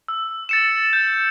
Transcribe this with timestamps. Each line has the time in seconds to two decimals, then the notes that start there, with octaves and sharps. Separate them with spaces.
0.08 E6
0.49 A6 C#7 E7
0.93 G6